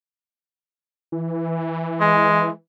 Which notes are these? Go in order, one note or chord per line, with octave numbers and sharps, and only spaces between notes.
E3
G#3